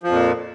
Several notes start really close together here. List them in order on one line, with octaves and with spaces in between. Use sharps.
F3 F2 A#2